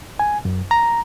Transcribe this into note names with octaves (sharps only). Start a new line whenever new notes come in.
G#5
F#2
A#5